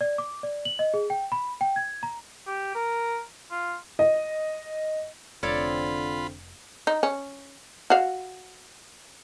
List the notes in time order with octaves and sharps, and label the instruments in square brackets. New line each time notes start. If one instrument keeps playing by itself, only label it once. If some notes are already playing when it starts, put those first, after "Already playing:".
[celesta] D5
D6
D5
F#7
D#5
G#4
G5
B5
G5
G#6
A#5
[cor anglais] G4
A#4
F4
[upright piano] D#5
[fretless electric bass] F1 [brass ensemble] D3 C4 [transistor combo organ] F4 B5 [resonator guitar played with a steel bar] A4 C#5 D5
[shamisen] D#4
C#4
F#4 F5